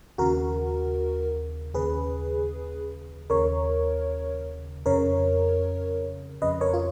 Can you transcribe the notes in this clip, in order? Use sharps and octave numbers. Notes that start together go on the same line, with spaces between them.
D#2 C#3 F#4 A#4
D#2 C#3 G#4 B4
D#2 C#3 A#4 C#5
F2 C#3 A#4 C#5
F2 C#3 B4 D#5
A#4 C#5
F4